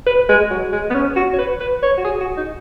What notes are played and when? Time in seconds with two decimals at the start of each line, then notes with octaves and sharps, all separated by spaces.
0.06 B4
0.29 G#3
0.50 F#3
0.72 G#3
0.90 B3
0.94 C#4
1.16 F#4
1.33 C#5
1.39 B4
1.60 B4
1.83 C#5
1.97 F#4
2.04 G#4
2.21 F#4
2.37 D#4